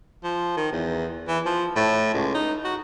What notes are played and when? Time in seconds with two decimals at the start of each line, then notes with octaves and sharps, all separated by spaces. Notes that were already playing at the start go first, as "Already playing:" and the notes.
0.24 F3
0.57 D#3
0.72 E2
1.28 E3
1.46 F3
1.76 A2
2.14 C#2
2.35 D#4
2.64 F#4